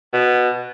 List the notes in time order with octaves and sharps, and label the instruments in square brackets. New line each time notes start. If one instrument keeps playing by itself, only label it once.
[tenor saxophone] B2